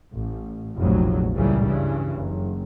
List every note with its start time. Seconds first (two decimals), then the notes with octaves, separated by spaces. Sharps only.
0.14 A1
0.78 F1 A#1 F2 A2 F#3
1.33 C#2 A#2 C#3 E3 G3
1.65 G2 C#3 E3
2.16 F#1